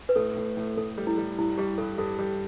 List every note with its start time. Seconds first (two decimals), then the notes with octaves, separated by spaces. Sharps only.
0.09 B4
0.16 A2 A4
0.36 A2
0.57 A2
0.77 A2 A4
0.98 G3
1.07 E4
1.18 G3
1.38 G2 E4
1.58 G3 G4
1.78 G2 A4
1.98 G2 A4
2.19 G3